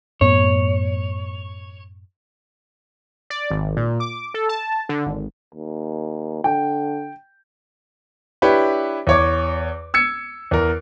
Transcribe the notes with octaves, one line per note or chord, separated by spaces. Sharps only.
F#2 A2 B3 C#5
D5
G#1
A#2
D6
A4
A5
D3
G#1
D#2
D3 G5
D4 E4 G4 B4 C#5
E2 C#5 D6
E6 G#6 C#7
E2 A#4